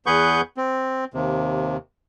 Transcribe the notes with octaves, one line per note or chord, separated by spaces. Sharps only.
E2 G#4 B4 F#5 C#6 G6
C4
D#2 C3